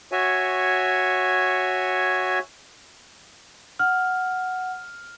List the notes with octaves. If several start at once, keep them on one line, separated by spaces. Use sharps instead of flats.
F#4 C#5 E5 G#5
F#5 F6